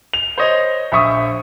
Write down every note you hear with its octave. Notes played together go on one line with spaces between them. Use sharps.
F7
C5 C#5 D#5
A#1 E5 C#6 D#6